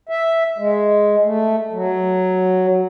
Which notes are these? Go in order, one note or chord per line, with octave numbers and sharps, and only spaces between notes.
E5
G#3
A3
F#3